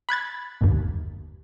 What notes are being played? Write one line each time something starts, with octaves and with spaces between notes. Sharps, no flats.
B5 F#6 G#6 A6
G1 D#2